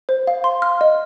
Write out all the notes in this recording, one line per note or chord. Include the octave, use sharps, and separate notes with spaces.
C5
F5
C6
F6
D#5